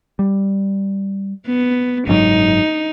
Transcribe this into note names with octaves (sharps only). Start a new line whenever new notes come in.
G3
B3
F#1 G#2 F#3 D#4